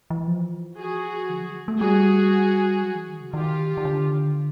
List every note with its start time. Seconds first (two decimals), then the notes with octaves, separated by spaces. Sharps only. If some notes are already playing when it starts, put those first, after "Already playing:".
0.10 E3
0.27 F3
0.78 F#4 G#4
1.29 D3
1.42 F#3
1.68 A3
1.80 G3 F#4 G#4
2.83 F#3
2.95 E3
3.08 D#3
3.21 C#3
3.34 D#3 F4 G4
3.77 D#3
3.85 D3